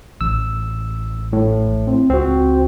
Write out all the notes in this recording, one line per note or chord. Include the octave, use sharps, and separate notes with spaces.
A1 E6
A2
C4
C#2 C4 F#4